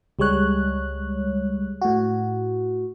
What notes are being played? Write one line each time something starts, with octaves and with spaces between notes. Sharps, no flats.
C#2 G3 G#3 C#5 F#6
A2 F#4